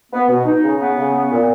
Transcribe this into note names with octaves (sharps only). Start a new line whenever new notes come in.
B3
B2
D#4
C#3
B3
C#3
B3
A#2